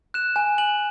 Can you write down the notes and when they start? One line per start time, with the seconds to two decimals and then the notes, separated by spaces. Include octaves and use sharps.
0.14 F#6 E7
0.36 G#5
0.58 G#5 F#7